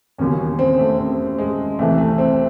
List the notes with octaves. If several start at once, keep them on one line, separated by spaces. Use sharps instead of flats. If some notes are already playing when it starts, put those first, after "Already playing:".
E1 D#2 C#3 F#3 C#4
C4
A3
C4
G#3
C2 C3 E3 A3
A3
C4